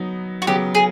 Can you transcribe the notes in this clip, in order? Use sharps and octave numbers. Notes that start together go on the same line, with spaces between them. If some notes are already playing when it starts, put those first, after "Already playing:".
Already playing: F#3 B3 D#4
F#4
C#3 F#3 B3 G4
G#4